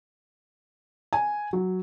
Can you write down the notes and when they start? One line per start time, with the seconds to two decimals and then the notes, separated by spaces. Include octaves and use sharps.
1.13 G#5
1.53 F#3